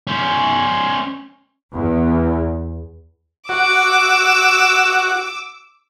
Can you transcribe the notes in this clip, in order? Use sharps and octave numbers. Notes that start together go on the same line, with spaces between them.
C#4 C5
E2
F#4 D6 E6